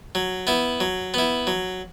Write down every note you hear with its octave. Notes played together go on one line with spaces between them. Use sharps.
F#3
B3 E4
F#3
B3 E4
F#3